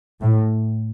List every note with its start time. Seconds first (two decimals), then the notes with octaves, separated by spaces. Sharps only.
0.21 A2